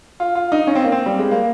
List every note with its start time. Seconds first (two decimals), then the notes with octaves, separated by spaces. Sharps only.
0.20 F4
0.35 F4
0.52 D#4
0.67 C#4
0.75 C4
0.84 A#3
0.92 C4
1.06 G3
1.19 G#3
1.31 A#3